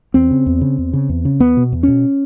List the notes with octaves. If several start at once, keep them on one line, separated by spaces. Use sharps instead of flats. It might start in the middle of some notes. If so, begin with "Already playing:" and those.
E2 C4
C#3
E2
C#3
E2
C#3
E2
C#3
E2 B3
B2
E2
B2 C#4